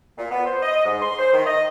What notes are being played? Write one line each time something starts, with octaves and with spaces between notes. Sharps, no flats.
A#2
B3
C5
D#5
G#2
C6
C5
D#3
D#5